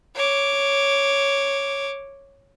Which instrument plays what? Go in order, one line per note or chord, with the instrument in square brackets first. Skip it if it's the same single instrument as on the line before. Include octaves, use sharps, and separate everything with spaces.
[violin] C#5 D6